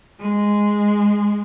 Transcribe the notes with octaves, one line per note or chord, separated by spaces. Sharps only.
G#3